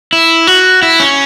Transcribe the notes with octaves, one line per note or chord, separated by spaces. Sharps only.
E4
F#4
E4
C#4